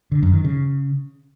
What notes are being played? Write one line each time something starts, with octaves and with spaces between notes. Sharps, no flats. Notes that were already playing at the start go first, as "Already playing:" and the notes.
D3
F#2
D#3
C#3